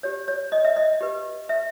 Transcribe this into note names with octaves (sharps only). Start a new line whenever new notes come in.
G4 C#5
C#5
D#5
E5
D#5
G4 B4
E5